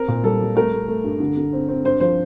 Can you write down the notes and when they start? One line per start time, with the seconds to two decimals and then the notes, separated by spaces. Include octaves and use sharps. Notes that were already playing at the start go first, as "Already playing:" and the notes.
Already playing: C4 A#4
0.08 A#2
0.23 G3 A4
0.40 G3
0.55 A3 A#4
0.72 A3
0.88 A3
1.04 G2
1.20 D3
1.37 D3
1.53 C4
1.69 C4
1.85 G2 C5
2.00 F3 C5